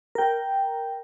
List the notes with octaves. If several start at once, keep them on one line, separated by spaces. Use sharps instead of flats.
A#4 G5